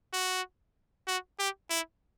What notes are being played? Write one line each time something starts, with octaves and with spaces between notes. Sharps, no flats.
F#4
F#4
G4
E4